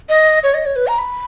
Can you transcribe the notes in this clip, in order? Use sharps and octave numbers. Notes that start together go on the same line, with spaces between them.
D#5
C#5
D#5
C#5
B4
A#5
B5